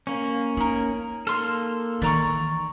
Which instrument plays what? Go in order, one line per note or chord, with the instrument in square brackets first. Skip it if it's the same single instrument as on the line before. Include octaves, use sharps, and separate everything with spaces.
[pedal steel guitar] A#3 C#4
[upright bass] D#4 [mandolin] G#4 A#4
[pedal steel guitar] A#3 A4 [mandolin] C6 F6
[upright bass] D#3 E3 [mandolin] D5 A#5 C#6